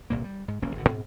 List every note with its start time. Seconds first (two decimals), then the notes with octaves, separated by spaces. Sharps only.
0.10 G1 C2 A#2 A#3
0.24 G3
0.48 G#2
0.62 F1 B1 A#3 C#4
0.75 G#1 B2 D3
0.88 D2 G#2 B2 C4